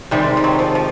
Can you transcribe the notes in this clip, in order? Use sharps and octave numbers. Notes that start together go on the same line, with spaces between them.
C3 D#3 G3 G#3 C4
G3
F#3
F3
F3